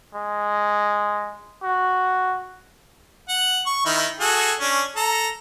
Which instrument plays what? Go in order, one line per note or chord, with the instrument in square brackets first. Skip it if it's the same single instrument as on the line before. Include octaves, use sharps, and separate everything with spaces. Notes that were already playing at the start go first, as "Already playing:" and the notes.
[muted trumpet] G#3
F#4
[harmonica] F#5
C#6
D#3 D#4 E4
F#4 G#4 A4
C#4 D4
A4 A#5